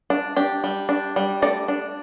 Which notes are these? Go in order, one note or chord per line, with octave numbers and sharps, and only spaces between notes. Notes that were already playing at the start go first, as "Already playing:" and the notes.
D4
D4 G4
G3
D4
G3
A3 D5
D4